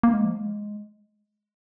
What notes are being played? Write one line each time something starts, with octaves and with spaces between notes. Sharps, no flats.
A#3
G#3
F3
G#3